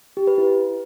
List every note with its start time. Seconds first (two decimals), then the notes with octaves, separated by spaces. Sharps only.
0.17 G4
0.27 B4
0.38 E4